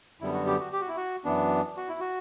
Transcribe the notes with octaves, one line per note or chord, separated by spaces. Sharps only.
F#2 D3 G3 B3 E4
F#4
G4
F#4
G4
F#4
E4
F#4
F#2 E3 B3 D4
F#4
E4
F#4